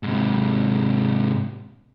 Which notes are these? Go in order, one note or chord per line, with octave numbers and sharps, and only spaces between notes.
G#2 C3